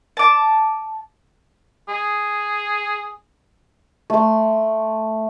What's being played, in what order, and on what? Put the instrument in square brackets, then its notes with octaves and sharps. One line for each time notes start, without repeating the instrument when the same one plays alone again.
[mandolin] A5 D6
[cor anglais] G#4
[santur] A3 C6